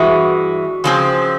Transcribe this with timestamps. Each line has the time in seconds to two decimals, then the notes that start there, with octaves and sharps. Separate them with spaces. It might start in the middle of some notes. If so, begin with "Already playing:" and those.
Already playing: G2 E3 G#3 F#4
0.84 C#3 F3 G#3 C4